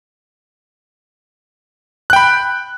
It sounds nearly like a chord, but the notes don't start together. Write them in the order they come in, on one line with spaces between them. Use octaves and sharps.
F#6 G5 B5